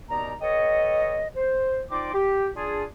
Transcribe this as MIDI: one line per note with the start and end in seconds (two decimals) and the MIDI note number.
0.10 0.34 39
0.10 0.34 47
0.10 0.34 59
0.10 0.34 63
0.10 0.34 74
0.10 0.34 82
0.41 1.28 67
0.41 1.28 69
0.41 1.28 71
0.41 1.28 73
0.41 1.28 75
1.36 1.81 72
1.91 2.12 60
1.91 2.12 63
1.91 2.12 65
1.91 2.12 74
1.91 2.12 84
1.91 2.12 86
2.13 2.48 67
2.56 2.84 62
2.56 2.84 65
2.56 2.84 68